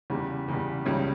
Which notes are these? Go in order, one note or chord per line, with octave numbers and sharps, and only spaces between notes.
E2 C#3 G3
E2 C#3 G3
C#2 C#3 G3 C#4